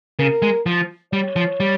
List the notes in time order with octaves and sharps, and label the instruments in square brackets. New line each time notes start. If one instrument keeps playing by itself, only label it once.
[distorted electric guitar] C#3 [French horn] A#4
[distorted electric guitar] G#3
F3
[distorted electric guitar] G3 [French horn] C#5
[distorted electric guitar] F3
G3